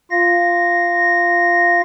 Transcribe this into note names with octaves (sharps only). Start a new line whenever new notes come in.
F4 F5 A#6